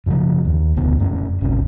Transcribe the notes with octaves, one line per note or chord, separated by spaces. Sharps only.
F#2 C#3 F3
D#2
E1 D2 B3
E1 F#2 A3 C#4
D#1 G#1 C3 C#4